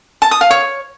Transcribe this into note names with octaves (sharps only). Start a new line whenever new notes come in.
A5
D#6
F5
C#5